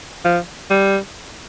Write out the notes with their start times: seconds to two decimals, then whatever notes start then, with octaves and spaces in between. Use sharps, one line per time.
0.25 F3
0.70 G3